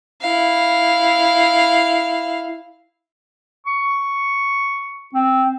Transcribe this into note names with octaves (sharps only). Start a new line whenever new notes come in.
E4 F5
C#6
C4